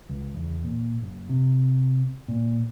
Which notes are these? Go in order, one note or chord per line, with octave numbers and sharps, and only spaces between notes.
C#2
E2
A#2
F#1
C3
A#2